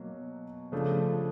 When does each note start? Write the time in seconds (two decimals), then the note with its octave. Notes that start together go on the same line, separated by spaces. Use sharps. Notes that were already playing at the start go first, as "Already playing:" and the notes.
Already playing: B2 F#3 A#3
0.72 C#3 F3 A3 D4